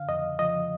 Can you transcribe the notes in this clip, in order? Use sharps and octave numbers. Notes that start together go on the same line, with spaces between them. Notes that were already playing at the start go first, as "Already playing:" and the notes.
Already playing: D3 F5
F2 D#5
F3 D#5